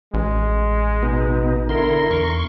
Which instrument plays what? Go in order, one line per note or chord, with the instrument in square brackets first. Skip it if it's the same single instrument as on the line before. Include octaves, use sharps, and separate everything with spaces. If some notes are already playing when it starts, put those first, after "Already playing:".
[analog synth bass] A1 [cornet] G#3
[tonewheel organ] B2 B3 D#4
[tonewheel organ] D3 E4 C6 [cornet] A#4
[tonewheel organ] E2 C6 C#6